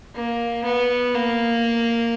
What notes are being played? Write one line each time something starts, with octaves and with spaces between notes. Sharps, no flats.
A#3
B3
A#3